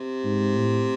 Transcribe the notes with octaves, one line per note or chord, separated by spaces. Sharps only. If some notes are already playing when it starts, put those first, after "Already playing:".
Already playing: C3
G#2
A2